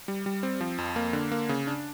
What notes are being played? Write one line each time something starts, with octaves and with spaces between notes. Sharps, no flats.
G3
G3
C4
F3
F2
A#3
D3
A#3
C#3
D4